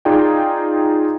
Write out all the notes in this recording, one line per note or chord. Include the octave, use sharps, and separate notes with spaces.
D#4 F4 G#4 D5 G5